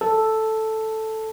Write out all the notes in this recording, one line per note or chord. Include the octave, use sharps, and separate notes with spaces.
A4